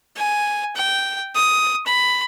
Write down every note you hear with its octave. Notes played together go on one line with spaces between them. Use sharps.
G#5
G5
D#6
B5